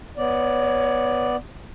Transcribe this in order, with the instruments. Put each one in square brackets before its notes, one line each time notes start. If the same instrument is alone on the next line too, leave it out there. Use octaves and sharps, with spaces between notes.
[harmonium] B3 D5 [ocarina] C#5